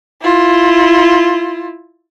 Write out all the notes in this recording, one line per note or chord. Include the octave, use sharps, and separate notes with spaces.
E4 F4